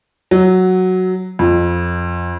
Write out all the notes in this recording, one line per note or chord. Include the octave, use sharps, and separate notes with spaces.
F#3
F2